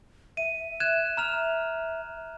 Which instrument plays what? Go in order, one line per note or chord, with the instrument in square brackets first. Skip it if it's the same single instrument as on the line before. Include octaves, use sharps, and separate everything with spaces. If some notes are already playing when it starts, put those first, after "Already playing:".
[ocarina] E5 [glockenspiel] D#7
[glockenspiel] F#6 G#6 E7
A#5 F6 F7